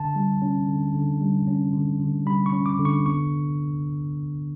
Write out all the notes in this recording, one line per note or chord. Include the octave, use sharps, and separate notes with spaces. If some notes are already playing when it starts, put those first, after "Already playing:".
Already playing: D3 A5
G3
C#4
D3
D3
G3
C#4
D3
D3
G3 B5
C#6
C#4
D6
D3
C#6
B3 C#6